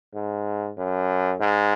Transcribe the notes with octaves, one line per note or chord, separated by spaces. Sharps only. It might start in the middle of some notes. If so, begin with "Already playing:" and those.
G#2
F#2
G#2